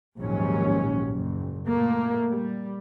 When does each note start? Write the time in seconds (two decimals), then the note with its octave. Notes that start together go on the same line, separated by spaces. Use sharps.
0.18 A#1 D#2 G#2 F#3 C#4
1.10 F#1
1.69 A#2 A3 A#3
2.28 G3